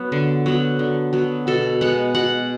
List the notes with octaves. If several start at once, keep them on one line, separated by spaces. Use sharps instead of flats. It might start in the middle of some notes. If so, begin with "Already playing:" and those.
Already playing: F#3 B3
D3
F#3 B3
D3
F#3 B3
B2 A4
G#3 B3 F#5
B2 F#5